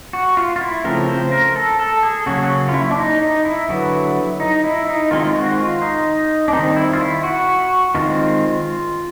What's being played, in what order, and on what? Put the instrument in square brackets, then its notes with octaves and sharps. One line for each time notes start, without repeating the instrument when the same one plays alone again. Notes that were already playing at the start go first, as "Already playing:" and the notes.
[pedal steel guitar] F#4
F4
F4
E4
C#3 F3 A3 C4 A#4
C5
A#4
A4
A4
G#4
C#3 F#3 A#3 C#4 F#4
F4
E4
D4
D#4
D#4
E4
D3 F#3 B3
D#4
E4
D#4
D#3 G#3 C4 F4
F#4
F4
D#4
D4
D#3 G3 C4 D#4
E4
F4
E4
F#4
D#3 G#3 C4 F4